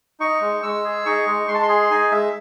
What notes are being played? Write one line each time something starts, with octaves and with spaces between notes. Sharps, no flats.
D#4 C#6
G#3
G#3 E6
G#4
D#4 C#6
G#3
G#3 C6
A5
C6
G#4
D#4 G#5
G#3 E5